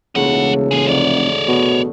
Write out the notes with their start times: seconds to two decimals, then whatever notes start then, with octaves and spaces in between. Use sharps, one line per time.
0.15 E1 C#2 C#3 A3 D#4 F#5
0.71 E1 A1 G#4 A4
0.88 F1 D2 C#5 D5
1.48 B2